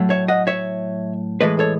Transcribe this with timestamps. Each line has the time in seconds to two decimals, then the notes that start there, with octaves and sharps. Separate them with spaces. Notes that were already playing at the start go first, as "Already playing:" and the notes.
Already playing: A2 F#3 A3
0.10 C#5 E5
0.28 D#5 F#5
0.47 C#5 E5
1.41 A2 E3 G#3 B4 D#5
1.59 A4 C#5